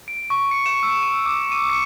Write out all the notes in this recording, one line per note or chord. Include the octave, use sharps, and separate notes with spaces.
D7
C#6
C#7
E7
E6
D#7
D6
D#7
C#7